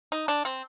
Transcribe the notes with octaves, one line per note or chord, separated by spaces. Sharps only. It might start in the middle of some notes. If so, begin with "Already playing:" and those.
D#4
D4
C4